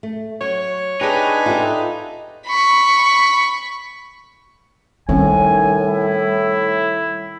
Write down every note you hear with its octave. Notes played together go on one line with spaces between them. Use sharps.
A3
F#3 C#5
D4 D#4 G4 G#4 B4 G#5
F4 G4 A4 E5
B5 C#6
A2 D#3 G3 C4 C#4 G#5
E4